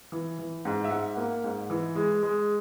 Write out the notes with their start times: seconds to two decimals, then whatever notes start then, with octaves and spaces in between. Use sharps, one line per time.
0.12 E3
0.39 E3
0.65 G#2
0.84 E5
0.90 G#2 F#5
1.17 A#3
1.44 G#2
1.70 E3
1.95 G#3
2.23 G#3